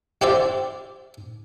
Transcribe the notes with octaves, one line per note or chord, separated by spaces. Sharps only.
E4 G4 C5 D5 E5